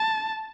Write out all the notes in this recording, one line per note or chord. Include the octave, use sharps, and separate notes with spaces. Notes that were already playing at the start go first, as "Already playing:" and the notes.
Already playing: A5